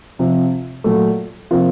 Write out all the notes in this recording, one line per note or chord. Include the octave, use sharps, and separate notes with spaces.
C3 F3 C4
A#2 F#3 A3
C3 F3 A#3 F4